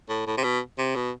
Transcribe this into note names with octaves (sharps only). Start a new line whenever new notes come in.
A2
A2
C3
B2
C3
B2